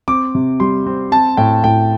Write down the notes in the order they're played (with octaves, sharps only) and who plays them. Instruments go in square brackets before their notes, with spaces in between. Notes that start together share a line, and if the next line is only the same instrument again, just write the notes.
[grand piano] C4 D6
C3
G3 C6
C4
C4 A5
A2 G5
A2 G5